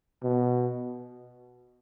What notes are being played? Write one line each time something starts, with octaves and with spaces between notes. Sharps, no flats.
B2